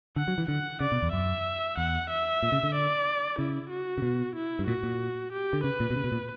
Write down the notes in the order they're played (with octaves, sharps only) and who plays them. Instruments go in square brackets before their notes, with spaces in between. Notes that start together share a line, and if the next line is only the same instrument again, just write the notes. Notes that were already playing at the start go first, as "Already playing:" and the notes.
[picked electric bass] D3 [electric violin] F#5
[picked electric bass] F#3
E3
[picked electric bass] D3 [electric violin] F#5
[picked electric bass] C#3 [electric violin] D5
[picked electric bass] B2
E2
[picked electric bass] F#2 [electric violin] E5
[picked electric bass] E2 [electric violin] F#5
[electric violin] E5
[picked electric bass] A#2
C#3
D3
[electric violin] D5
[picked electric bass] C#3 [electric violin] E4
[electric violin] F#4
[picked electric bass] C#3
B2
[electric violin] E4
[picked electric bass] G2
[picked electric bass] A#2 [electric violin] F#4
[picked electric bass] A#2
[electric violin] G4
[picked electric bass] D3
[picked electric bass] C#3 [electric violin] B4
[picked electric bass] A#2
B2
C#3
B2
A#2